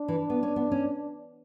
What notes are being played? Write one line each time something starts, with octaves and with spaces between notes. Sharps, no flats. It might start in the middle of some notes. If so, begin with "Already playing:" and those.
Already playing: D4
E3
B3
C#4
B3
C#4